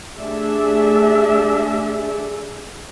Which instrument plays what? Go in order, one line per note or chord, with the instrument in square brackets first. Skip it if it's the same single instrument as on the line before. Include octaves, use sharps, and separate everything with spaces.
[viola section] A3 D4 G4 G#4 D5 E5